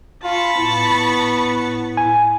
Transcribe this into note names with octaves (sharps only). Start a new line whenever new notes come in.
F4 A5 B5 C#6
A2 B3
G#5